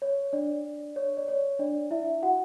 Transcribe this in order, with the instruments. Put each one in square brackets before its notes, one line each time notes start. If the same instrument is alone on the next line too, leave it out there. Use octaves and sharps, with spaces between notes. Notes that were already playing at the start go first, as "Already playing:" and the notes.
[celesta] C#5
D4 D5
C#5
D5
C#5
D4 D5
E4 E5
F#4 F#5